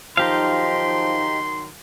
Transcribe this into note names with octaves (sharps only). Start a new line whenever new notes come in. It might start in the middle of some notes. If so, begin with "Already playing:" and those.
D#3 F3 F#3 D#4 G4 F5 C6